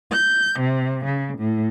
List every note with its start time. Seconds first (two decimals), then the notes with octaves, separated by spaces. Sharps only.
0.11 G6
0.58 C3
1.04 C#3
1.38 A2